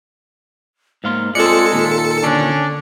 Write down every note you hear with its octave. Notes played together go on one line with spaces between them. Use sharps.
G#2 A#3 F5 C6
G#3 C4 F4 A4 D5 C#7
D#2 A#2 F4
D3 C#4 D4